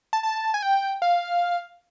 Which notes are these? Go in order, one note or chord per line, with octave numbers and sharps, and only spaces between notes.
A5
A5
G#5
G5
F5